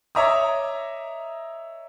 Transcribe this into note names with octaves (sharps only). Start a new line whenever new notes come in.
C#5 D#5 E5 A#5 D6 D#6